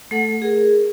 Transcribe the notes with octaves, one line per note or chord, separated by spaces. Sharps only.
A3 A4 F#5
G#4 A#4